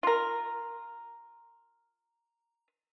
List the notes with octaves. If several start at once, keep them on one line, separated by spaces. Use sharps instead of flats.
F4 A#4